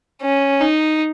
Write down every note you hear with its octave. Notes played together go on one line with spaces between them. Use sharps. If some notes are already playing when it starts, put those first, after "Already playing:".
C#4
D#4